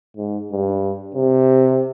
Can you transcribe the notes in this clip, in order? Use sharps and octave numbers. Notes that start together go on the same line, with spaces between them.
G#2
G2
C3